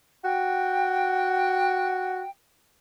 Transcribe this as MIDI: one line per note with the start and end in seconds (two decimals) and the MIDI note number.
0.25 2.23 66
0.25 2.30 79